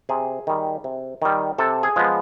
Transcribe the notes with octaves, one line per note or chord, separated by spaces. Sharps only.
C3 G#4
D#3 G3
C3
D#3 G3
C3 A4
G#4
F3 G#3 B3